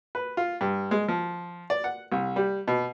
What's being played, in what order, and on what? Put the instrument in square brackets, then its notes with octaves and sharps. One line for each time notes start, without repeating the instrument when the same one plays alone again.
[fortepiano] B4
F4
G2
G#3
F3
D5
F#5
C2
G3
B2